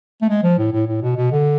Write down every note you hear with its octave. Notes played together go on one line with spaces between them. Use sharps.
A3
G#3
F3
A2
A2
A2
B2
B2
D3